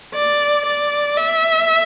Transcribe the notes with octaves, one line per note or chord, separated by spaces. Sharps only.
D5
D5
E5